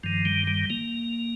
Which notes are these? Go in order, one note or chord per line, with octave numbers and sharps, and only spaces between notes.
G2 D#3 F3
G3
G3
A#3